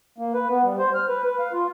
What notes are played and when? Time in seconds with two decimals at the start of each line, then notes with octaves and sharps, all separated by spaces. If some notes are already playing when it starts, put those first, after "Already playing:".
0.18 A#3
0.34 B4
0.50 B3
0.64 G3
0.79 C5
0.94 F6
1.09 B4
1.25 B4
1.39 F5
1.52 F4